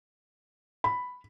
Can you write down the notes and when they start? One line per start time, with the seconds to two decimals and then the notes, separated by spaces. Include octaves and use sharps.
0.84 B5